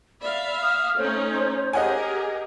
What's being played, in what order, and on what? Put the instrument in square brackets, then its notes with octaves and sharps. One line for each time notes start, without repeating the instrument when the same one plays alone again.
[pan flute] D5 [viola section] E5 F5 [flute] B5
[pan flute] D#6 [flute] F6
[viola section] A3 C#4 D#4 [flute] C5 [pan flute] C#5
[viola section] G4 G#4 A#4 [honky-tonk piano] D#5 F#5 G#5